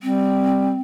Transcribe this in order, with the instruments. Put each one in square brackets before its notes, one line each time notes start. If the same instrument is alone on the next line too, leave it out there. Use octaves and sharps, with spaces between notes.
[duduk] G3 [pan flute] C4